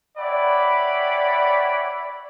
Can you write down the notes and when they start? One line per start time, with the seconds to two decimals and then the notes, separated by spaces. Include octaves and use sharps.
0.17 C#5 D5 E5 F#5 G5 B5